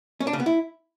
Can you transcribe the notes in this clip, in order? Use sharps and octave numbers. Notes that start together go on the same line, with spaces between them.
C#4
D4
C#3
B3
E4